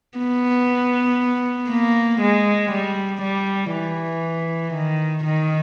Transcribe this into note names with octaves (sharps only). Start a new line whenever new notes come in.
B3
A#3
G#3
G3
G3
E3
D#3
D#3